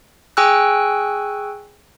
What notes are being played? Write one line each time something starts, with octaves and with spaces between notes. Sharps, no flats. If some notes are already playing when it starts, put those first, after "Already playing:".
G#4 G5 G#5 C#6 E6 F#6